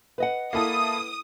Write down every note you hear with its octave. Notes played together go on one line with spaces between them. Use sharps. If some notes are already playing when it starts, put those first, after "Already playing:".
B4 D#5 F#5
A#3 E4 A4 D#6